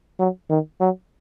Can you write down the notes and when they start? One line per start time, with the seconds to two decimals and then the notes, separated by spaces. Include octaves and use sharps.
0.19 F#3
0.50 D#3
0.80 F#3